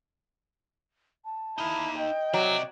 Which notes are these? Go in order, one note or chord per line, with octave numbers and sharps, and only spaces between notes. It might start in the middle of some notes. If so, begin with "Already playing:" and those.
A5
D#4 E4 F5
D#5 G5
C3 F#3 D5